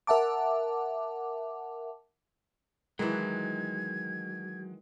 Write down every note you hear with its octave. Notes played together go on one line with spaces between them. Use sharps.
A#4 E5 F#5 A5 D6
D#3 E3 F#3 G#3 G#6